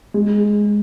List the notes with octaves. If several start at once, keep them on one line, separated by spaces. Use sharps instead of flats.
G#3